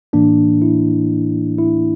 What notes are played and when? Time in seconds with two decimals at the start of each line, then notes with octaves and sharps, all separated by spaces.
0.13 A2 E3 A#3 D4
0.62 E4
1.58 E4